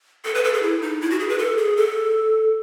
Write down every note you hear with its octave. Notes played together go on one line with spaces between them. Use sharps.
A4
B4
A4
G#4
E4
D#4
E4
F#4
G#4
B4
A4
G#4
A4